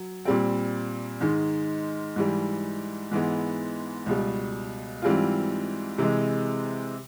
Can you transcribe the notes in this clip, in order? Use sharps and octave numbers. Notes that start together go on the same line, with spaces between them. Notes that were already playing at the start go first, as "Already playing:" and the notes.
Already playing: F#3
A#2 G3 C4
G#2 D#3 G#3
G#2 E3 G3
G#2 E3 G#3 B3
C#2 B2 G3
G#2 E3 G3 C4 F4
C3 E3 G#3